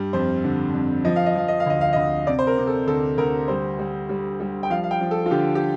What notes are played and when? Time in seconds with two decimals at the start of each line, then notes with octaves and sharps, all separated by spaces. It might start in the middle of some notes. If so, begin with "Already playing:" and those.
Already playing: G2 G3
0.13 F2 C5
0.44 D3
0.74 F2
1.04 F3 D#5
1.16 F5
1.26 D#5
1.35 F3 F5
1.48 D#5
1.60 F5
1.66 D2 D#5
1.81 F5
1.93 D2 D#5
2.27 C3 D5
2.39 C5
2.47 A#4
2.57 C3
2.67 A4
2.87 D2 A4
3.18 D2 A#4
3.48 G3 C5
3.79 G3
4.09 G3
4.40 G3
4.63 G5
4.70 F3 F5
4.83 F5
4.91 G5
5.01 F3
5.11 A4
5.26 F4
5.31 D3 G4
5.55 G4